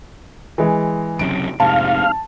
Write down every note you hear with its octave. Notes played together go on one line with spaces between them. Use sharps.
E3 G#3
F#1 F#2 C3 D7
F1 G#2 C3 F5 A5